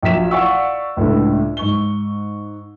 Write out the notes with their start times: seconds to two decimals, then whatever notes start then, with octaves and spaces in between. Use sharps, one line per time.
0.03 A#1 F#3 F4 B6 E7
0.31 D5 F5 F#5 C#6 E6
0.97 C#2 A2 D4
1.57 G#2 C#6 G7